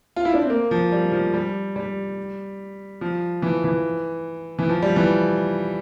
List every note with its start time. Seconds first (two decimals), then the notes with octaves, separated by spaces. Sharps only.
0.16 F4
0.25 E4
0.34 D4
0.42 C4
0.50 A#3
0.71 F3
0.92 G3
1.12 F3
1.34 G3
1.76 G3
3.01 F3
3.42 E3
3.64 E3
4.59 E3
4.69 F3
4.82 G3
4.96 E3